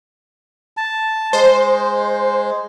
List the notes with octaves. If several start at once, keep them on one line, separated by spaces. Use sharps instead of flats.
A5
G#3 C5